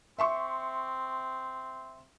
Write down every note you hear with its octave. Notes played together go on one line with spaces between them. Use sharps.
C4 E5 C6 C#6